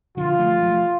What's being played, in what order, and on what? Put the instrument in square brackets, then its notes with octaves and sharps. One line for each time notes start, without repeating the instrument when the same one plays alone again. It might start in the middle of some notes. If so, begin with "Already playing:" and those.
[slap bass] D3 F3 [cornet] F4
[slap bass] F3 A3
F3 A3